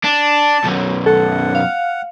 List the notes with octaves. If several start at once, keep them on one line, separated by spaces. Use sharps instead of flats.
D4 A5
B1 F#2
A4 F#5
F5